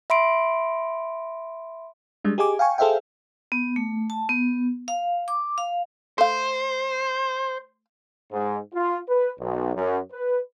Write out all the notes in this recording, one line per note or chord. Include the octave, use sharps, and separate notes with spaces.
E5 B5 C6 D7
G3 G#3 D4
G4 G#4 D#5 G#5 D6
F5 G5 G#5 C#6
G#4 A4 C5 E5 F5 G5
B3
A3
A5
B3
F5
D6
F5
A3 C5 F5
G#2
F4
B4
B1
F#2
B4